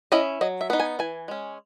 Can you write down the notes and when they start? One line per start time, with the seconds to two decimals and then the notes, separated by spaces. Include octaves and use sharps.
0.12 C#4 E4 D#5
0.41 F#3 D#5
0.61 E5
0.70 B3 D#4
0.80 G#5
0.99 E3 G#5
1.28 G#3 C#4